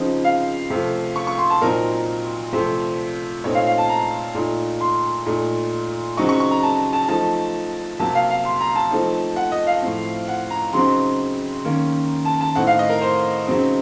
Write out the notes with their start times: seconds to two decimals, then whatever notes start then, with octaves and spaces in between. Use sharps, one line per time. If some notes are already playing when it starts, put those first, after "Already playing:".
Already playing: C#3 F3 C4 D#4
0.24 F5
0.70 C3 F3 A3
1.16 C#6
1.27 C#6
1.38 C6
1.50 A5
1.61 A#2 F#3 C4 D#4 A#4
2.53 C3 F3 A3 C5
3.44 A#2 A3 C4 D#4 C#5
3.55 F5
3.66 F5
3.78 A5
3.89 A#5
4.35 A#2 A3 D#4
4.81 C6
5.26 A#2 A3 D#4
6.17 C#3 F#3 C4 D#4 C#6
6.29 C#6
6.40 C#6
6.51 A#5
6.63 A5
6.93 A5
7.08 F3 A3 D#4 A5
8.00 C3 F#3 A#3 A5
8.15 F5
8.30 F5
8.45 C6
8.61 A#5
8.75 A5
8.91 F3 A3 C4 D#4
9.36 F#5
9.52 D#5
9.67 F5
9.82 A2 F3 C4
10.28 F#5
10.50 A#5
10.73 C#3 F#3 C4 D#4 C6
11.64 D#3 A#3 C#4
12.25 A5
12.41 A5
12.55 A2 A3 C4 D#4 F#5
12.67 F5
12.79 D#5
12.89 A#4
13.02 C5
13.47 C#3 F#3 C4 D#4